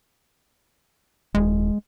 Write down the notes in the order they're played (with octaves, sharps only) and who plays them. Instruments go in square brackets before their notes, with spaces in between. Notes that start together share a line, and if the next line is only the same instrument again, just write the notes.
[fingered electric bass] D#1 [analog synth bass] G#3